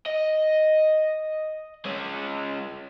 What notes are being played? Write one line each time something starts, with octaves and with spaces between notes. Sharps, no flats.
D#5
G#3 C#4